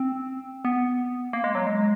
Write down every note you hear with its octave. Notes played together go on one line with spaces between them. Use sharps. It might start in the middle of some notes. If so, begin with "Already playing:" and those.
Already playing: C4
B3
A#3
G#3
F#3
G#3